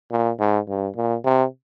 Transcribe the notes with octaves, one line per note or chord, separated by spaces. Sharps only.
A#2
G#2
G2
A#2
C3